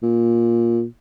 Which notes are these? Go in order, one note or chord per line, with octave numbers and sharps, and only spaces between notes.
A#2